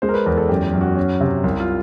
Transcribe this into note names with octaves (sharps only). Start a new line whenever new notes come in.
G#3 C5
A#4
B4
E2 A#4
A4
F#2 G4
F#2
F#4
C#4
C3
C2
F4